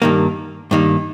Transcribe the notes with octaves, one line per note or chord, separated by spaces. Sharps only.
G2 D#3 A#3
G2 D#3 A#3